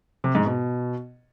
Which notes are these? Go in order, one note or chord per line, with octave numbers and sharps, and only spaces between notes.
C3
G#2
B2